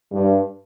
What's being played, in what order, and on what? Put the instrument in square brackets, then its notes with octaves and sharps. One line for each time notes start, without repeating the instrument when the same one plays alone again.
[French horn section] G2